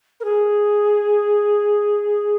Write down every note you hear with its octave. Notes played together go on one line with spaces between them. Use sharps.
A#4
G#4